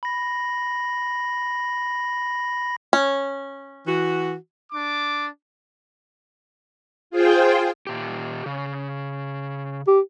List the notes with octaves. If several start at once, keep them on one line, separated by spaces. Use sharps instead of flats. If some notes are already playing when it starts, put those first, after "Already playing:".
B5 A#6
C#4
E3 F#4
D4 D6
F4 G#4 C5 G5
A#2 G4
C#3
G4